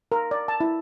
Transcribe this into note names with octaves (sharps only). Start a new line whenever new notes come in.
A#4
D5
A5
E4